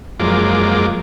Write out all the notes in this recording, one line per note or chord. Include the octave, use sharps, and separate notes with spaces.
F#2 F3 G#3 A#3 D6